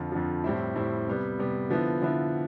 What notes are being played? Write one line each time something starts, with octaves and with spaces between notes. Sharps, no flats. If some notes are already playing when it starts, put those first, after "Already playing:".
Already playing: F2 D3 F3
F2 D3 F3
A2 G3 C4 E4
A2 G3 C4 E4
C3 G3 B3
C3 G3 B3
D3 F3 B3 E4
D3 F3 B3 E4